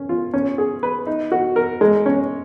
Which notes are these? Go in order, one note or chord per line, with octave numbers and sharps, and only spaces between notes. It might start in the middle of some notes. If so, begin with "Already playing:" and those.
Already playing: C#4
F4
C#4
G#4
B4
D#4
F#4
A#4
G#3
C#4